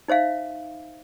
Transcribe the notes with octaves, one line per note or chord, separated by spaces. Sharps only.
D#4 C5 E5 F5